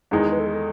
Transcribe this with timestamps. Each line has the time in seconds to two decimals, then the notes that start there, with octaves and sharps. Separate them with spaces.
0.11 E2 D#3 G#3 D#4 G#4
0.32 B4
0.39 A4
0.46 G#4
0.54 A4